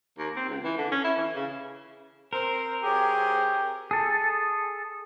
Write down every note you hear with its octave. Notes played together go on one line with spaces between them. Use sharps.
D#2
C4
C#2
E3
D3
C#4
E4
E3
C#3
C4 A#4 C5
F#3 C4 G4 G#4
G#4 A4